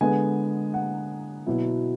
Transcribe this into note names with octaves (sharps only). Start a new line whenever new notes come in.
D3 G#3 B3 G#5
F#5
B2 F#3 B3 E4